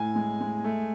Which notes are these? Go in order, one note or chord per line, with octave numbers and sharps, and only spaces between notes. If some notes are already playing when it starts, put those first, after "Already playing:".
Already playing: A2 G#5
G#3
G#3
A3